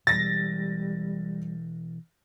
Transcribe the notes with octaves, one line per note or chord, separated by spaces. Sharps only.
B2 E3 G3 B3 A6 A#6